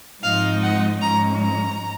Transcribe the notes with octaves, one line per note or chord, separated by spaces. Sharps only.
G#2 F3 G#3 C4 D#4 F5
F#5
G#2 F3 G#3 C#4 A#5
A#5